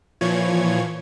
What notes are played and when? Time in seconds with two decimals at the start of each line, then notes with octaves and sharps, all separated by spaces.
0.21 A#2 E3 F3 C#5 G#6